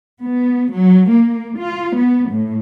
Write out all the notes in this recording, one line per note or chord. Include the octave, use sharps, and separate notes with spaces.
B3
F#3
A#3
F4
B3
A2